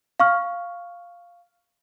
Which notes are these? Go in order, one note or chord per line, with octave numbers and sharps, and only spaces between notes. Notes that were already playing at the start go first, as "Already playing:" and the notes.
F5 C#6 F6